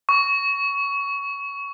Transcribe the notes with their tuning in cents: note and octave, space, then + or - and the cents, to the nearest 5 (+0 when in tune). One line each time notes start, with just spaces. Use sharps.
C#6 +15